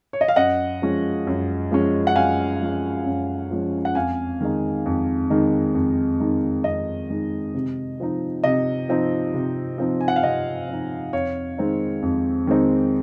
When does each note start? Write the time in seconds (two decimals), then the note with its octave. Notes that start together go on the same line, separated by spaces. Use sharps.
0.13 C#5
0.21 D#5
0.28 F5
0.36 F#2 D#5 F#5
0.82 F3 G#3 C#4
1.27 F#2
1.71 F3 G#3 C#4
2.07 F#5
2.16 F#2 F5 G#5
2.62 F3 G#3 C#4
3.06 F#2
3.51 F3 G#3 C#4
3.85 F#5
3.95 F2 F5 G#5
4.41 D#3 G#3 D#4
4.86 F2
5.30 D#3 G#3 D#4
5.74 F2
6.20 D#3 G#3 D#4
6.64 F2 D#5
7.10 D#3 G#3 D#4
7.54 C3
8.00 F3 C4 D#4
8.44 C3 D#5
8.89 F3 C4 D#4
9.34 C3
9.78 F3 C4 D#4
10.01 G#5
10.08 F#5
10.16 F5
10.23 C3 D#5
10.69 F3 C4 D#4
11.13 F2 C#5 F5
11.58 D#3 G#3 C4 D#4
12.02 F2
12.47 D#3 G#3 C4 D#4